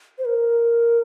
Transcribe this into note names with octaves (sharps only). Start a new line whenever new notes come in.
C5
A#4